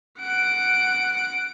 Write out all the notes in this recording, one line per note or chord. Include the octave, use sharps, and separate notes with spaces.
F#5 D7